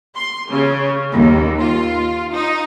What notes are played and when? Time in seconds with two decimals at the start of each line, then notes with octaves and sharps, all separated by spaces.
0.16 C6
0.51 C#3
1.11 D#2
1.58 F4
2.32 D#4